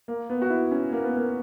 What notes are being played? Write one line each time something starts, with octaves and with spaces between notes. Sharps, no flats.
A#3
B3
F#4
E4
C#4
A#3
B3
A#3